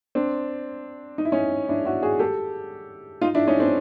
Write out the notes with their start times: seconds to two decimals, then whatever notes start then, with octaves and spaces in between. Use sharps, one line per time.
0.15 C4 D4
1.18 D#4
1.25 E4
1.32 C#4 D#4
1.69 D4 E4
1.85 E4 F#4
2.03 F#4 G#4
2.19 G4 A4
3.21 D#4 F4
3.34 D4 E4
3.47 C#4 D#4
3.60 C4 D4